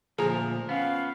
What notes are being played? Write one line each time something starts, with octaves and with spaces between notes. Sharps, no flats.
D2 A#2 F3 G#4 A#5
B3 C#4 F5